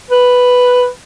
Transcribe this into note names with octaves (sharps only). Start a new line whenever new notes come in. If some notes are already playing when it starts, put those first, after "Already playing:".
B4